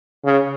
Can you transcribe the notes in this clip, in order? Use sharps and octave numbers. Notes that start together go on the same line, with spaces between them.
C#3